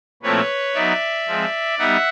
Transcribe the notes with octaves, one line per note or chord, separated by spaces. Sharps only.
A#2 F3 A3 C4 E4 B4 C#5
F#3 B3 D#4 D5 E5
F3 G#3 C4
G3 B3 D#4 E5 F#5